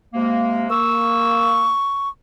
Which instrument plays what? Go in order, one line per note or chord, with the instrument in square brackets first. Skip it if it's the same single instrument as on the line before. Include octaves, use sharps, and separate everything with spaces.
[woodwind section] C3 G#3 A#3
[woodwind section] A#3 E6 [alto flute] C#6